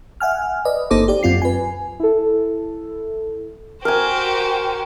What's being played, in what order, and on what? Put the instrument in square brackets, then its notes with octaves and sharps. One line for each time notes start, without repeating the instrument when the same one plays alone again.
[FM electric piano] E5 F#5 G#5 F6
B4 D5 D#5
G1 A#3 D#4 A4 C5 D6
G4 D5
F#2 C4 F4 C7
B4 G#5
[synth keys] E4 A4
[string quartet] F#4 G4 C5 [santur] A#4 G#5